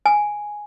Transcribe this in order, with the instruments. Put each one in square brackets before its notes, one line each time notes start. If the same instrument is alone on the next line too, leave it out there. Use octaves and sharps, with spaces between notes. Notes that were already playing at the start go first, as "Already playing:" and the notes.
[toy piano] G#5